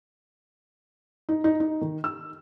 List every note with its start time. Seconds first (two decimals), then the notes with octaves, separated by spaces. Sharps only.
1.29 D#4
1.44 D#4
1.60 D#4
1.81 D#3
2.04 E6